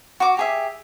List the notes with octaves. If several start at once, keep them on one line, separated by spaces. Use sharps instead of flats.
F#4 D6
G4 G#4 E5